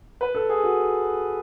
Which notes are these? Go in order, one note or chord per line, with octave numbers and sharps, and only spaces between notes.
B4
A4
G#4
F#4